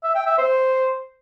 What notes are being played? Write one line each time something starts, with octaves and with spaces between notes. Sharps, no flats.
E5
G5
E5
C5